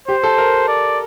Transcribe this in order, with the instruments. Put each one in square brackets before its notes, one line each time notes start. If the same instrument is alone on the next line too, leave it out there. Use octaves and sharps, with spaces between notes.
[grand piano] G4 [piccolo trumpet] C5
[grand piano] A4
A#4
[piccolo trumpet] D5